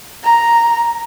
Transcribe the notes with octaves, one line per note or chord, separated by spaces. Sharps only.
A#5